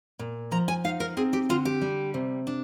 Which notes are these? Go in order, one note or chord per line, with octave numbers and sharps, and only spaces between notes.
A#2
F3 A#5
G#5
D#4 F5
A#4
C4 G#4
G4
D3 F4
G4
G3
C3
D4